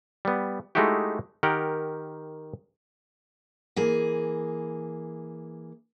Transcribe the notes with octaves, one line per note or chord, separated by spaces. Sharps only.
G3 B3
G#3 A3 D#4 E4 F#4 G4
D#3 G4 A#4 F#5
E3 A#3 G#4